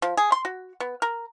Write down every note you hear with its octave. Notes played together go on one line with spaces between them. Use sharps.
F3
G#4
C6
F#4
B3
A#4